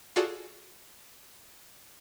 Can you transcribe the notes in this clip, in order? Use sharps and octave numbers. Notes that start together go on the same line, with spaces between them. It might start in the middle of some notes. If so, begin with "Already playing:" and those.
F4 F#4 G#4 A4 D5